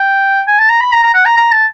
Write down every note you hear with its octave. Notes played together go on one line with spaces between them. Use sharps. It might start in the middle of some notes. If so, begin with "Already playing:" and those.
Already playing: G5
G#5
A5
A#5
B5
A#5
A#5
F#5
A#5
A#5
A5